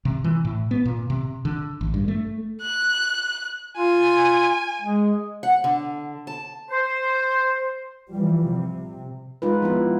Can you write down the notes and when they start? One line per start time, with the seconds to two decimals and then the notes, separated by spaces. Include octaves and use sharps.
0.05 C3
0.24 E3
0.45 A2
0.71 B3
0.85 A#2
1.10 C3
1.45 D3
1.81 A1
1.94 G2
2.08 A3
2.62 F#6
3.77 F4 G#5
4.81 G#3
5.43 F#5
5.64 D3
6.27 A5
6.70 C5
8.11 E3 F3 G3
8.50 C3
9.42 G#3 D#4 F4 B4
9.62 F3 B3 E4